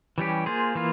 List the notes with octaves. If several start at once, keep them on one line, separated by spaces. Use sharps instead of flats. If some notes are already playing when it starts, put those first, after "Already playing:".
E3 G3 C#4 G4
A#3 F4 G#4 C5
E3 A#3 F4